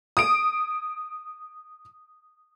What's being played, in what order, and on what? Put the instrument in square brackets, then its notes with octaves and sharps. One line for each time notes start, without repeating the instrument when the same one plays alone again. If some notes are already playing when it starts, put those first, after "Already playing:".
[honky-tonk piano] D#6 D7